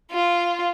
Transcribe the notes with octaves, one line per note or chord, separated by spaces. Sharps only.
F4